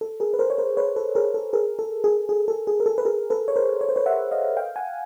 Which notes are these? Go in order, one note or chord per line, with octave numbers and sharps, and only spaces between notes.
A4
G#4 A#4
B4
A#4 C5
C#5
A#4 C5
B4 C#5
A4 B4
G#4 A#4
A4
G#4 A#4
A4
G#4
G#4
A4
G#4
A#4
A4
B4
G#4 A#4
A4 B4
C#5
A#4 C5
C#5
C5
B4 C#5
E5 F#5
D#5 F5
F5 G5
F#5 G#5